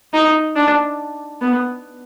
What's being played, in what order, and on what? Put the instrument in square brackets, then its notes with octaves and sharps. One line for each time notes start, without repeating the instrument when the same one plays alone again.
[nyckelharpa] D#4
D4
B3